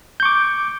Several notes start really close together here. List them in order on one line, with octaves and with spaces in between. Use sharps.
G6 C#6 D6